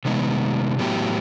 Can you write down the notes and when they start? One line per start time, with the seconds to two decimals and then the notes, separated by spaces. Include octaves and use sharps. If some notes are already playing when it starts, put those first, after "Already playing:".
0.05 C3 D#3 G#3 B3
0.78 A2 F#3 B3 E4 G4